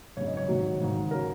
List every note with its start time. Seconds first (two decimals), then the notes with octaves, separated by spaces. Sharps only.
0.17 G#1 F#2 C#3 C#5
0.27 D#5
0.37 C#5
0.48 G#1 G#2 D#3 F#3
0.80 G#1 G#2 D#3
1.11 C#3 F#3 A#4